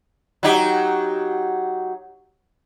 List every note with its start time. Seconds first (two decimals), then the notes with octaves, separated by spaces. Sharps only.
0.43 F#3 D#4 G4